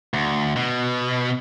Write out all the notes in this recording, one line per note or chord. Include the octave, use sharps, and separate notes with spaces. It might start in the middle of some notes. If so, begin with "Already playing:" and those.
D2
B2